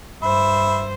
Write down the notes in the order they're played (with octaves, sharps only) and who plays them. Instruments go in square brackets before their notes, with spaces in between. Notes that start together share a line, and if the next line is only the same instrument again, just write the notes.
[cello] G2 C5 [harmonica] E5 [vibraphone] B5